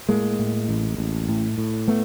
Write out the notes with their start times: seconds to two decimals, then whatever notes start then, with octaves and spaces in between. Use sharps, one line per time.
0.09 A2 G#3 A#3
0.39 A2
0.69 A1
0.98 A1
1.29 A2
1.58 A2
1.88 A3 B3